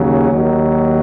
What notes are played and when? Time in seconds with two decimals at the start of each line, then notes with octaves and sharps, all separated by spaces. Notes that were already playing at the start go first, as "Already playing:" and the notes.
Already playing: D#2 C#3 F#3
0.32 D#2 D#3 F#3